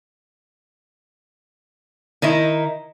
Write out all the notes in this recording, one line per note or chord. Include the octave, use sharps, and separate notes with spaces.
D#3 D#4 E4